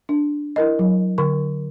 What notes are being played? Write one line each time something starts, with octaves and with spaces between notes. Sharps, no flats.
D4
E4 A#4 D#5
F#3
D3 C#6